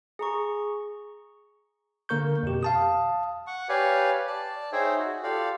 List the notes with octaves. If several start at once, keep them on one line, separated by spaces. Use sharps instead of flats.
G#4 A#5 C#6
D3 A#3 A#4 C#6 G6
F2 B2 G4
F5 A5 D#6
F#5 C#6
G4 B4 C#5 D5 F5 G#5
D5 A5
D#4 G#4 C5 C#5 E5 G5
F#4
F4 G4 A4 D5 F5